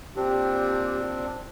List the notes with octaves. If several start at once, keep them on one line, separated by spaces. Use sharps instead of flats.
A#2 C4 D4 G4